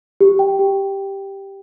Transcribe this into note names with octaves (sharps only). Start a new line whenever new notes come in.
G4
G5
G4